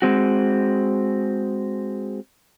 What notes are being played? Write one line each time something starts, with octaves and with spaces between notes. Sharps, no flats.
G#3 C4 F#4